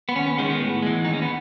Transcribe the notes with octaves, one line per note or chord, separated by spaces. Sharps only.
B3
D#2 C#4
B3
D#3 G#3 C#4
B3
A2
E3 G#3
D#2 D#4
C#4
B3